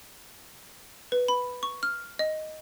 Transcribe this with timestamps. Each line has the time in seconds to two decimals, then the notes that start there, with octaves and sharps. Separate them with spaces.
1.12 B4
1.28 B5
1.63 C#6
1.83 F6
2.19 D#5